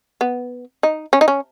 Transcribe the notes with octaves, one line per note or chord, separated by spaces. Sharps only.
B3
D#4
C#4
D#4
C#4